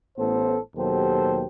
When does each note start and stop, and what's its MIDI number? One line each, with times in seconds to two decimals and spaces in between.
0.18 0.57 33
0.18 0.57 45
0.18 0.57 59
0.18 0.57 69
0.18 0.57 72
0.76 1.45 39
0.76 1.45 47
0.76 1.45 54
0.76 1.45 67
0.76 1.45 69
0.76 1.45 72